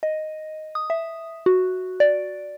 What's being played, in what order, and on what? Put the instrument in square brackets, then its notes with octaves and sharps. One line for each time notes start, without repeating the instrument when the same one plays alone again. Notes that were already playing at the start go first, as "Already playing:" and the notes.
[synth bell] D#5
D#6
E5
F#4
D5